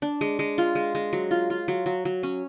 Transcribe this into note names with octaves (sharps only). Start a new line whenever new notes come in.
D4
G#3
G#3
F4
G#3
G#3
F#3
F4
F4
F#3
F#3
F#3
C#4